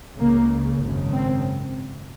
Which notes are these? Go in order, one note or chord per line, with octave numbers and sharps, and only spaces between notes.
C#2 C#3 A#3
G#1 F#2 C#3
C4